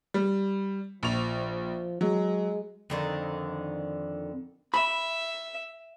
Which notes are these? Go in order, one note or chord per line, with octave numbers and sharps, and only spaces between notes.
G3
A#1 F3 F7
F#3 G#3
F2 D3 D#3
E5 B5